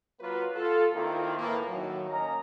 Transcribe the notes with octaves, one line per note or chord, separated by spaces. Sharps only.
F#3 A#3 F4 F#4 B4
F4 A4
D#3 A#3 C4 E4 F4
A2 E3 A#3
A2 D#3 F#3
A#3 C#4 D#5 A#5